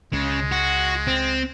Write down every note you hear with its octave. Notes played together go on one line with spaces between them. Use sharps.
C#2 C#3 G#3
F#4
C4